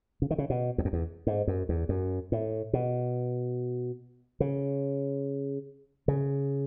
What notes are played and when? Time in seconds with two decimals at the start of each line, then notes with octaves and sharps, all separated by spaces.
0.22 C#3
0.31 D#3
0.38 C#3
0.50 B2
0.78 E2
0.85 F#2
0.93 E2
1.27 G#2
1.47 F#2
1.69 E2
1.89 F#2
2.32 A2
2.73 B2
4.40 C#3
6.08 C#3